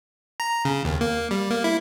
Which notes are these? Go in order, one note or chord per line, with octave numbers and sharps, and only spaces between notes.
A#5
C#3
D#2
A#3
G3
A#3
E4